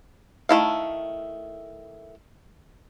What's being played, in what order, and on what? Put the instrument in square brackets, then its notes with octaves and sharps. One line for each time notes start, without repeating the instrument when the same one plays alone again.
[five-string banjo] D#3 A3 E4 F5